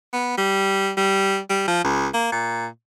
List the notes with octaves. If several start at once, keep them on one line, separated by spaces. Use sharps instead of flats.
B3
G3
G3
G3
F3
C#2
A#3
A#2